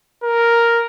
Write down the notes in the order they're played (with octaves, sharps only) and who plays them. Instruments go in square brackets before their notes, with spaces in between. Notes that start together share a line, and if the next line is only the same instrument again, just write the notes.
[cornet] A#4